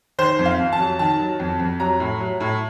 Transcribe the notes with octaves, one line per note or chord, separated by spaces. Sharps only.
D#3 C5
F2
F5
F2
A5
F#3
D#3 A5
F#3
F2
F2
F#3 A#5
A2
F#3
A2